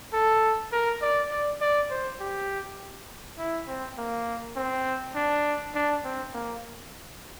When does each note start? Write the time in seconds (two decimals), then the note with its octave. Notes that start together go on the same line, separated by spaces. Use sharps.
0.13 A4
0.72 A#4
1.02 D5
1.31 D5
1.61 D5
1.91 C5
2.20 G4
3.38 E4
3.68 C4
3.98 A#3
4.56 C4
5.15 D4
5.75 D4
6.04 C4
6.34 A#3